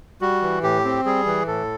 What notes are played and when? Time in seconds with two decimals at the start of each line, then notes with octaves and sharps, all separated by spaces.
0.21 G3 F#4
0.42 E3
0.63 A2 G4
0.85 C4
1.05 G3 G#4
1.26 E3
1.47 A2 A4